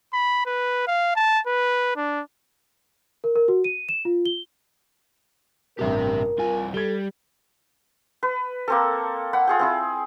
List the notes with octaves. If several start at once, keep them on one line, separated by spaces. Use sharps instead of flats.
B5
B4
F5
A5
B4
D4
A#4
A#4
F#4
D#7
E7
F4
G7
A1 G2 C3 G4 A#4 E5
C2 F4 G#5
G3 A4 G#6 G7
B4
A#3 C4 A4
F#5 B5
F4 G#4 G5
C4 E4 G#4